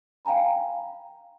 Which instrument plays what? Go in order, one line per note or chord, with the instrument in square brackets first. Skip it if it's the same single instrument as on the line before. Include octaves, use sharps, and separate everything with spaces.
[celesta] F5 G5 G#5 A#5 B5